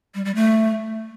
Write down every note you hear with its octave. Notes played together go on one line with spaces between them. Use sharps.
G3
G3
A3